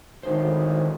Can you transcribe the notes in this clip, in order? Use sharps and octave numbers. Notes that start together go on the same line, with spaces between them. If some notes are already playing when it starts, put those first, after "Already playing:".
G#1 D2 A2 D#3 D#4 C5